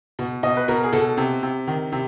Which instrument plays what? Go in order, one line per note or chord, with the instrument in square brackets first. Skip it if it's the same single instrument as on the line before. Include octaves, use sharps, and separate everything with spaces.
[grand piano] B2
B2 D#5
B4
B2 A#4
G#4
B2 A4
C3
C3
D#3
C3